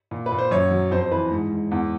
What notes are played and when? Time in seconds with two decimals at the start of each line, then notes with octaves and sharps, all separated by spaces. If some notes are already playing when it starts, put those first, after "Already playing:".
0.11 A#2
0.26 B4
0.32 A#2
0.38 C5
0.51 F#2 C#5
0.71 F#3
0.91 F2 C5
1.01 C5
1.11 E3 B4
1.31 G#2
1.51 G#2
1.71 E2